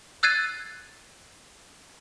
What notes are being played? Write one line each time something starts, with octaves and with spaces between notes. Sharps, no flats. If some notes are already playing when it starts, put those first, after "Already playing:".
E6 F#6 G#6 A6 C7 D#7